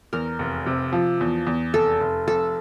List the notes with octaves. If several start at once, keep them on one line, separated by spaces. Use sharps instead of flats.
E2 A#4
F1
C3
F3
E2
E2
F1 A4
F1
F2 A4